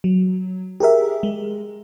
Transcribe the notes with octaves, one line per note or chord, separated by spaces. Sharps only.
F#3
G4 G#4 A#4 E5
G#3